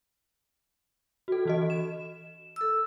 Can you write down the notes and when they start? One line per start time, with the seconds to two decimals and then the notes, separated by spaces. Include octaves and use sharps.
1.28 F#4 A4
1.45 E3 F#4 D#5
1.70 E7
2.56 A4 E6